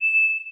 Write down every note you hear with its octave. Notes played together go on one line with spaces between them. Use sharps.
E7